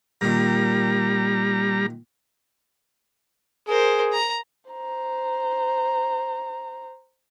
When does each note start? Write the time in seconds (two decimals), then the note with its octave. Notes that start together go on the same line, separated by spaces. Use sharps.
0.21 A#2 D#3 G3 A#5
3.68 G#4 A#4 C5
4.13 A#5
4.71 C5 A#5